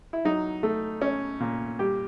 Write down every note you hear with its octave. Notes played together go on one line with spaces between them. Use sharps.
E4
F#3 D#4
A3
C#4
A#2
G3 G4